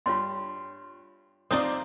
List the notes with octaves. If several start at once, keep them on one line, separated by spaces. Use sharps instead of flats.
G2 F4 C#5 C6
F3 C4 D#4 F4 C5 D5 D#6